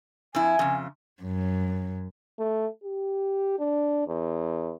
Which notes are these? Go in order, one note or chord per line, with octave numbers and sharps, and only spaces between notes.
F2 E4 G#5
F2 C#3
F#2
A3
G4
D4
E2